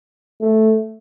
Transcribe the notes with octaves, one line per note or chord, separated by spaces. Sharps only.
A3